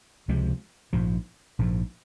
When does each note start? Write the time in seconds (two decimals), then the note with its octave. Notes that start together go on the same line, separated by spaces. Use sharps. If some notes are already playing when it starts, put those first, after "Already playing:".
0.28 C#2 C3 F3 G#3
0.93 A#1 G#2 F3
1.59 A#1 G#2 F3